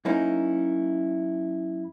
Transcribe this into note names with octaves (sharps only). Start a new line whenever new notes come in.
F#2 A#3 C#4 D#4 E4